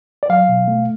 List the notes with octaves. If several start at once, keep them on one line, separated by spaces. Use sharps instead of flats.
D5
F#3 F5
B2
A3